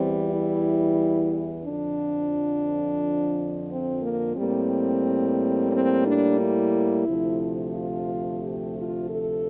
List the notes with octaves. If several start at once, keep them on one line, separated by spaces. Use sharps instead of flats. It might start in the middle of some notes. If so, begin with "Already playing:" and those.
Already playing: E2 E3 G3 C4
E4
F2 D3 F3 D4
C4
A#3
A2 G3 A#3 C4
C4
D4
E4
D2 C3 F3 A3
F4
G4
F4
A4